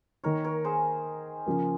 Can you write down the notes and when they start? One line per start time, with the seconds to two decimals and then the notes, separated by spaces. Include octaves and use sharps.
0.24 D#3 A#3 D#4 A#4 C#5
0.44 A#4 C#5
0.65 G#4 C5
1.46 C#3 F3 A#3